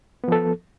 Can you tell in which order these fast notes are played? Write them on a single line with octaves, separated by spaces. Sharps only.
B3 F3 A4